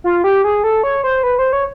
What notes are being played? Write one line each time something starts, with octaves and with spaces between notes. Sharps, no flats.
F4
G4
G#4
A4
C#5
C5
B4
C5
C#5